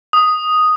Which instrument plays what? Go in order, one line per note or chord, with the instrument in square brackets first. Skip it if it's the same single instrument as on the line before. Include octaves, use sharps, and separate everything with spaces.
[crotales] D#6